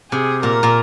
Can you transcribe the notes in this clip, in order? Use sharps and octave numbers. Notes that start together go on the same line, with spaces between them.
C3 G#4
A#2 A#4
A#2